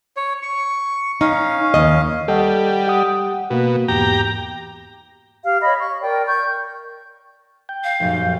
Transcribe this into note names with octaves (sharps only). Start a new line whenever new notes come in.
C#5
C#6
C#4 D#4 F5
D#2 D#5
G3 A4 D#5 F#5
G4 F#5 D#6
B2 A#3 F#4
E2 G#2 G4 A#5
G4 F5
C#5 D#5 B5
C#6
A#4 D5 G5
C#6 G6
G5
F5
F1 F#2 A#2